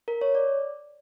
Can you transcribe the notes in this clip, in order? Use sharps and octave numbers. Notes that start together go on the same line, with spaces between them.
A#4
C#5
D5